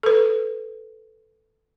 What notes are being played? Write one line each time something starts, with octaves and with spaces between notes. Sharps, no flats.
A4 B4